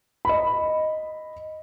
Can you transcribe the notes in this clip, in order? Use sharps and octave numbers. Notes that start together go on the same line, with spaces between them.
D#5 B5